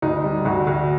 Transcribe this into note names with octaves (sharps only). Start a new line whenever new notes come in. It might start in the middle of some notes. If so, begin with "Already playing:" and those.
D2 D#4
G3
D2 F#4
D2